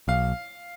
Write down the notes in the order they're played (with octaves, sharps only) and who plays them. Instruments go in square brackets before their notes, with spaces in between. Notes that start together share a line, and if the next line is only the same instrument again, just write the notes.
[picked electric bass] B1 [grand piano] F5